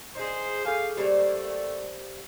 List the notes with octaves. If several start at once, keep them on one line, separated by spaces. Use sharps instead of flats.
D#4 G#4 C5
G#4 A4 F5 G#5 G6
G3 A3 A#3 G4 C5 D5